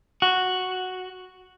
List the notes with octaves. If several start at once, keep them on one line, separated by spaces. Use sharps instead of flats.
F#4